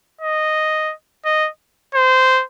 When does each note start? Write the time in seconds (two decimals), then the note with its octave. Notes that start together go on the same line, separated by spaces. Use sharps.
0.21 D#5
1.25 D#5
1.95 C5